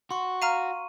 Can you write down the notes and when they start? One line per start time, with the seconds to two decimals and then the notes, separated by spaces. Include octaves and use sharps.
0.10 F#4 C6 C#6
0.42 F5 A#5 F6 D#7